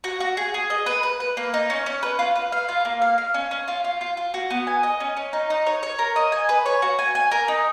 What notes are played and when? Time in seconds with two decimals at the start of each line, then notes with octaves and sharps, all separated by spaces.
0.04 F#4
0.20 F#4
0.37 G#4
0.54 G#4
0.70 D#5
0.86 B4
1.03 B4
1.20 B4
1.37 A#3
1.54 D#4
1.70 C#4
1.86 C#4
2.03 B4
2.19 F4
2.36 B4
2.52 F5
2.69 F4
2.85 A#3
3.02 F5
3.18 F5
3.34 C#4
3.51 C#4
3.68 F4
3.84 F4
4.01 F4
4.17 F4
4.34 F#4
4.50 B3
4.67 G#5
4.83 D#5
5.00 C#4
5.17 C#4
5.33 D#4
5.50 D#4
5.66 C#5
5.83 C#5
5.99 A#4
6.16 D#5
6.32 G#5
6.49 B4
6.66 C#5
6.82 F#4
6.99 G#5
7.15 G#5
7.31 A#4
7.48 D#4